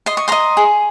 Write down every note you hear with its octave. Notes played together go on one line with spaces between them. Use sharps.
D#5 C6
C#6
D#5 A#5 C6
G#4